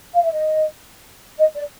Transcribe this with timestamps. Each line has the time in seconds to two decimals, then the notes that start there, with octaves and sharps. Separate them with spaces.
0.14 F5
0.23 E5
0.32 D#5
1.38 D#5
1.55 D5